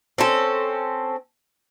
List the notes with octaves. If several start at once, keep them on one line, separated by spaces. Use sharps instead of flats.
C4 C#4 A4